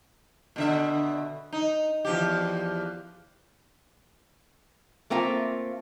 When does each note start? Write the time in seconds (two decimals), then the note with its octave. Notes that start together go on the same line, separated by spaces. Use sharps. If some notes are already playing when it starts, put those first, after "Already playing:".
0.56 B2 D3 E5
1.53 D#4
2.05 E2 F3 G4
5.10 A3 A#3 C4 F4 F5